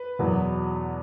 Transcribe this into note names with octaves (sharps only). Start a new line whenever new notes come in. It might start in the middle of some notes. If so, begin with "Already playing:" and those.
Already playing: B4
E2 B2 F#3 B3